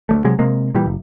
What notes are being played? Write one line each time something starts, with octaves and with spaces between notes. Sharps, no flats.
D2 G3 A3
C3 F#3 G#3
C3 G#3 A#3
A#2 E3 G3
F#1